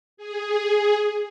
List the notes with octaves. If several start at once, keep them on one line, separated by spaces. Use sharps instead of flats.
G#4